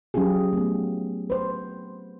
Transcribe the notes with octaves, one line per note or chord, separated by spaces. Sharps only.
F#3 C#4 F4 G4 G#4
A3 B3
B4 C5